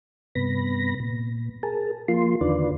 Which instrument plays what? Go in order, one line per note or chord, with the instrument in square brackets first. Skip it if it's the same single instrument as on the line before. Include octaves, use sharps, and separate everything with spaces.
[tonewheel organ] G2 C3 B3 B5 A#6
A#2
G#4 A#4 A5
F3 A#3 F4 C6
E2 D3 D#3 F4 B4 D5